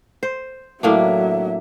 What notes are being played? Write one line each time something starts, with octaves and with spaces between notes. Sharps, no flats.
C5
A2 F#3 A#3 D4 E5